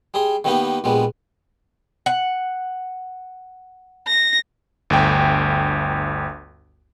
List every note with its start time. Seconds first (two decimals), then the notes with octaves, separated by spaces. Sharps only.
0.14 G3 G#4 C6
0.44 D#3 G3 A#3 B3 D#4 G4
0.84 A#1 G3 G#3 B3
2.06 F#5
4.08 A#6
4.90 G1 D2 G5